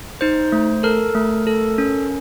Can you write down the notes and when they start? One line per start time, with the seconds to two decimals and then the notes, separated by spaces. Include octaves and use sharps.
0.21 D#4 C5
0.52 A3
0.83 A4 A#4
1.15 A3
1.47 A4
1.78 C#4